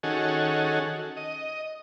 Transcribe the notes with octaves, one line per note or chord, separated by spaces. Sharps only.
D#3 C#4 F#4 G#4 A4
D#5